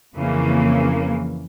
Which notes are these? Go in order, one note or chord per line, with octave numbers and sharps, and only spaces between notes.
F2 C#3 E3 A#3